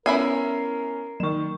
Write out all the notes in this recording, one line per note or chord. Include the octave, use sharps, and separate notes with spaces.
B3 C#4 E4 A#4 E5 G#5 C7
D#3 F#3 C#6 E7